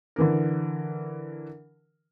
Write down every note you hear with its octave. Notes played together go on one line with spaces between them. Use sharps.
D3 E3 A#4